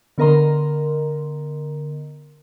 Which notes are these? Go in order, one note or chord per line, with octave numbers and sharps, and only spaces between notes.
D3 B3 A#4 D#5 A#5 C6